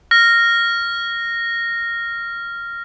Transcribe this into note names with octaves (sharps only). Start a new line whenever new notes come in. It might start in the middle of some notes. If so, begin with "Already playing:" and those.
F6 A#6